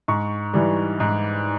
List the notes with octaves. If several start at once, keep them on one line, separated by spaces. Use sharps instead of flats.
G#2 C#6
E3 G3
G#2